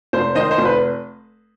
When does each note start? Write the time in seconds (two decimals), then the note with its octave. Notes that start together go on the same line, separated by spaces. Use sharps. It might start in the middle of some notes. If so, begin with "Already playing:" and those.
0.13 F1 C5
0.35 D#3 C5 D#5
0.51 C5
0.58 F1
0.65 B4